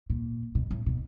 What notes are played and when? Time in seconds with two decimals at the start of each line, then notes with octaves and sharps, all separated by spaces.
0.10 A#2
0.55 B2
0.71 A2
0.86 B2